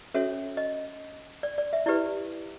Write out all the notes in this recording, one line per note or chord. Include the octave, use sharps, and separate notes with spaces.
C#4 F#4 A4 C#5 E5
D#5
D5
D5
E5
E4 G4 B4 D5